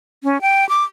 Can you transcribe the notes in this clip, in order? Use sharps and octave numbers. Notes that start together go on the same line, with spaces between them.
C#4
G5
D6